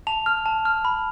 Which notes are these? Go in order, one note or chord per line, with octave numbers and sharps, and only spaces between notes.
A5 F7
F6
A5
F6
B5